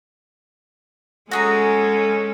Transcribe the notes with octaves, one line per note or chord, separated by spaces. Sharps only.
G#3 C#4 F#4 G#4 A4 A#5